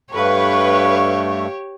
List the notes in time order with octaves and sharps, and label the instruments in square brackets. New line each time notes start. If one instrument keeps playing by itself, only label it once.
[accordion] G2 A3 [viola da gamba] G4 C#5 [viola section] B4 [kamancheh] F5 C#6